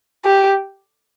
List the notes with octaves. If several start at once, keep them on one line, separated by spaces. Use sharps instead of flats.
G4